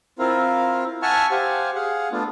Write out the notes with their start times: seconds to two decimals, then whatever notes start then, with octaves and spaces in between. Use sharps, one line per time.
0.19 C4 E4 F4 A#4 F5
1.02 E5 F#5 G#5 A5 C#6 F6
1.31 G4 C5 F5 F#5 G#5
1.75 G#4 F5 F#5
2.12 A3 B3 D4 F4